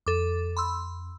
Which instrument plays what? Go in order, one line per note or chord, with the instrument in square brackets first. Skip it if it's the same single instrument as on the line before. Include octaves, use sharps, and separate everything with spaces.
[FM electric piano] F2 [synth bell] A4 D6
[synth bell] B5 C6 E6